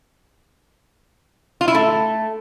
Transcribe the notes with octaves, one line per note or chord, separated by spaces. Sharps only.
F4
E4
A3